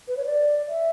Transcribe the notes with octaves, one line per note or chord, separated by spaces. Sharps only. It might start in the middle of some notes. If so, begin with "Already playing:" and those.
B4
C#5
D5
E5